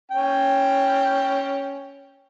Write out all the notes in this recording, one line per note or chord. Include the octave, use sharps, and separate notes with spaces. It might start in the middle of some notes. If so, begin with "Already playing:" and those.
C#4 G5